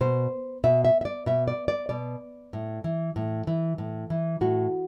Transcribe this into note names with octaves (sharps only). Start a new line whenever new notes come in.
B2 C5
B2 E5
E5
E5
D5
B2 E5
D5
D5
B2 D5
A2
E3
A2
E3
A2
E3
A2 F#4